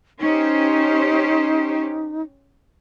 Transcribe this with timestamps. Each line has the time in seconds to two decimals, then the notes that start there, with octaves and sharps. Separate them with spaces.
0.20 C#4 D#4 G4 C5